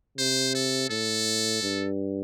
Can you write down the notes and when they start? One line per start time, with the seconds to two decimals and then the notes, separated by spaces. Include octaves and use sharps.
0.18 C3 C5
0.55 A4
0.90 A2 A4
1.62 G2